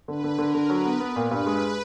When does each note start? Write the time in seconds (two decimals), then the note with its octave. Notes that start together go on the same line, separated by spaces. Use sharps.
0.08 D3 B4
0.24 D3
0.39 D3 A#4
0.55 D3
0.70 F#3 B4
0.85 B3
1.00 B3
1.16 A#2
1.31 G2 B4
1.46 G#3